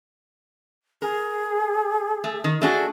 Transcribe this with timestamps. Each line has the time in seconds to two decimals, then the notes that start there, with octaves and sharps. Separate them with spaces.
1.02 G#4 A#4
2.24 A3
2.44 D#3
2.62 A3 D4 F#4 G#4